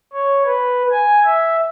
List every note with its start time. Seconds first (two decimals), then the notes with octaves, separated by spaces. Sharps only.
0.13 C#5
0.45 B4
0.91 G#5
1.25 E5